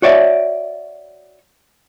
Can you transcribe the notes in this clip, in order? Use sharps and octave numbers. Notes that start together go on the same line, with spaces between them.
F#4 C#5 D5 E5